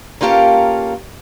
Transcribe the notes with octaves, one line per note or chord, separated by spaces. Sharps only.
A#3 C#4 F4 G4 A4 A#4